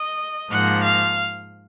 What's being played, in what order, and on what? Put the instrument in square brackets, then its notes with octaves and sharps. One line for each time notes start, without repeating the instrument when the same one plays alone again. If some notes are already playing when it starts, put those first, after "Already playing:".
Already playing: [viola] D#5
[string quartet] G#2 F3 A#3 [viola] F#5
[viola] F5